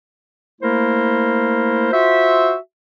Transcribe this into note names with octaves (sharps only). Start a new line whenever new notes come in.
A3 A#3 E4 A#4 C5
F4 F#4 C5 E5